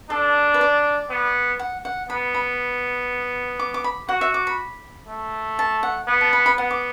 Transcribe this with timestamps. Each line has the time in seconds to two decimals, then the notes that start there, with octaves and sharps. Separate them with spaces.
0.10 D4 A4
0.54 B4
0.61 D5
1.10 B3
1.59 F#5
1.85 F#5
2.10 B3 B5
2.35 B5
3.59 D6
3.74 D6
3.84 B5
4.09 F#4 F#5
4.21 E5
4.34 D6
4.47 B5
5.08 A3
5.59 A5
5.83 F#5
6.08 B3
6.21 A5
6.33 B5
6.46 B5
6.58 B3 F#5
6.71 D6